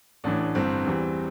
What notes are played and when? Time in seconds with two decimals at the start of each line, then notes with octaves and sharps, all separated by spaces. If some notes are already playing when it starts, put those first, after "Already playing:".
0.24 A1 A2 E3 D4
0.55 G1 G2 E3 C4
0.85 E2 E3 G3